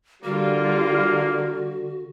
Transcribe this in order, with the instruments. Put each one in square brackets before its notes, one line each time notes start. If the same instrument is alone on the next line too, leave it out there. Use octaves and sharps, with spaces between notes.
[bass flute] D3 [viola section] G3 F4 [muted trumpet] A#3 [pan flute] F#4